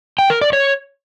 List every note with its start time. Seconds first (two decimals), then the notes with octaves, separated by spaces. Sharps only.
0.19 G5
0.30 A#4
0.41 D5
0.53 C#5